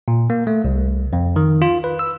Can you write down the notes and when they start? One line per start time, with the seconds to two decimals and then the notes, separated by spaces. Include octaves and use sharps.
0.08 A#2
0.30 A#3
0.47 A3
0.64 C2
1.13 F2
1.36 D#3
1.62 F4
1.84 B4
1.99 E6